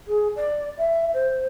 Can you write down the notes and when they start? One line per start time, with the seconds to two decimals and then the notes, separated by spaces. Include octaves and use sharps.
0.08 G#4
0.36 D5
0.78 E5
1.14 C5